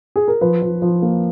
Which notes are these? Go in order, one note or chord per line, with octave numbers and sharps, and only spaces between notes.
G#4
A#4
F3 B4
F3
F3
A#3